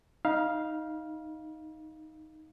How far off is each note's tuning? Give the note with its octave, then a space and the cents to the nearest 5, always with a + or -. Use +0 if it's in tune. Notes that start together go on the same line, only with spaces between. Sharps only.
D#4 +5 F5 +0 B5 -45